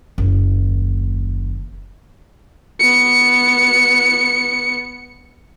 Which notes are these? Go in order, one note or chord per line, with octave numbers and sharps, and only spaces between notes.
F#1 D#2
B3 C#7